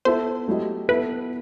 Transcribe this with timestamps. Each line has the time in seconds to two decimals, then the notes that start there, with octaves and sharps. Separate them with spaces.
0.05 B3 E4 A4 C5 E5
0.48 F#3 A3 E4 G4 D#5
0.89 B3 E4 A4 B4 E5